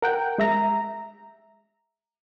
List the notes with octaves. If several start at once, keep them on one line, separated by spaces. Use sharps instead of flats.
A#4 F#5 G5
G#3 E5 A#5